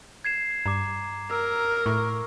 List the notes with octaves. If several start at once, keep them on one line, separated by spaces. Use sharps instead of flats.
G#6 C7 E7
G2 A#5 D6
A#4 E6
A2 C#6